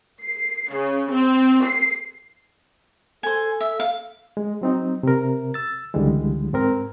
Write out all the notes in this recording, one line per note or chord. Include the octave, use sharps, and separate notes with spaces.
C7
C#3
C4
C7
A4 C5 G#5
E5
F5
G#3
F#3 C4 D#4
C3 A#4
E6 A6
C#2 D3 E3 G3 G#3
G#2 C4 A#4